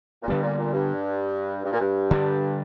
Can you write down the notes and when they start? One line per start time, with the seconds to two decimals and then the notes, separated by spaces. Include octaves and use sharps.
0.23 A#2
0.28 G2 D3 G3 B3
0.43 A#2
0.58 A#2
0.73 G2
1.65 G2
1.73 A#2
1.80 G2
2.11 D3 G3 B3 D4